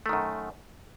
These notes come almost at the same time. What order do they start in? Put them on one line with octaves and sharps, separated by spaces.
A3 D#3 F#2